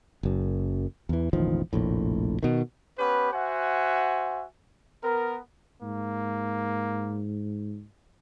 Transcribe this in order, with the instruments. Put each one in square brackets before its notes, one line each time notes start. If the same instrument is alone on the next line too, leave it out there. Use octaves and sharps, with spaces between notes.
[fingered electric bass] F#1 F#2
E2 E3
E1 A1 D#3 F3
F1 A#1 A2
B2 D#3
[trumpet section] B3 C#4 G4 B4
F#4 C5 E5 F#5 G#5
B3 A#4
[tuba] G#2 [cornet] A#3